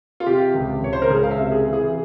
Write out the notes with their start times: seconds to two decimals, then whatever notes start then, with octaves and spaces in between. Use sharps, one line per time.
0.20 F4
0.26 C3 G4
0.54 C#2
0.82 C#2 C#5
0.93 C5
1.02 A#4
1.10 C#2 G#4
1.23 F5
1.31 E5
1.38 C3
1.52 G#4
1.66 E3
1.73 G#4